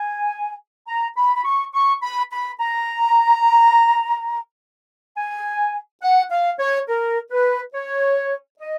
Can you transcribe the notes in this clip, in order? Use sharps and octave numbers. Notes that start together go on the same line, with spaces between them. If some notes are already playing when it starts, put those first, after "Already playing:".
Already playing: G#5
A#5
B5
B5
C#6
C#6
B5
B5
A#5
G#5
F#5
F5
C#5
A#4
B4
C#5
D#5